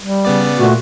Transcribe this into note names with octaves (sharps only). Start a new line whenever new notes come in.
G3
C#3 B3 D5
A#2 A3 F#4